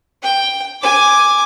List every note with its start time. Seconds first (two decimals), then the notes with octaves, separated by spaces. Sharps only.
0.23 G5
0.82 G#5 D6